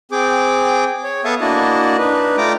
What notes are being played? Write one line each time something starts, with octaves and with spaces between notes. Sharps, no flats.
C4 G#4 G5 D6
C#5
B3 A4 E5 F5 C#6 D#6
A#3 D4 E4 F#4 D#5 A5
D4 D#4 B4
A3 F4 D5 G5 A#5 D6